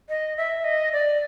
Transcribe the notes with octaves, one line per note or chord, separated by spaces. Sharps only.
D#5
E5
D#5
D5